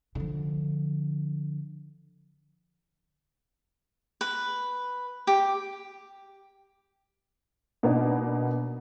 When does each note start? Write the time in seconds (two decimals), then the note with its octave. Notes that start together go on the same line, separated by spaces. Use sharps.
0.15 D3 F3
4.21 B4
5.27 G4
7.83 B2 A#3 B3 D4 D#4